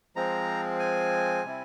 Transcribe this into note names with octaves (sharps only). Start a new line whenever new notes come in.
F3 G#3 C4 A#5
G#5
C3 G3 C4 E4